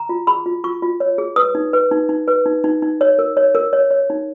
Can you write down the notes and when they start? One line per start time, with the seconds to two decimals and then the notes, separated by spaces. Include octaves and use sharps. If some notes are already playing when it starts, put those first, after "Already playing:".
Already playing: A#5
0.09 F4
0.27 G#4 B5
0.46 F4
0.64 F4 C#6
0.82 F4
1.00 C#5
1.18 G#4
1.36 B4 D#6
1.55 D#4
1.73 B4
1.91 D#4
2.09 D#4
2.28 B4
2.46 D#4
2.64 D#4
2.82 D#4
3.01 C#5
3.19 A#4
3.37 C#5
3.55 A#4
3.73 C#5
3.91 C#5
4.10 D#4